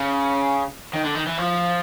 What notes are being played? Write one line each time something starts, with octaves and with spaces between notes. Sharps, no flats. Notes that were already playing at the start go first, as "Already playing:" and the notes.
Already playing: C#3
D#3
D3
D#3
E3
F3